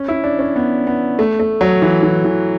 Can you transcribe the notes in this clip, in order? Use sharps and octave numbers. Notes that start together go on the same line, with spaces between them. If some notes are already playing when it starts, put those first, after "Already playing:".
Already playing: C#4
E4
D4
C#4
B3
B3
A3
A3
F#3
E3
E3
E3